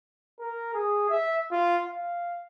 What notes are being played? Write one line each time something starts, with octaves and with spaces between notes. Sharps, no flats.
A#4
G#4
E5
F4
F5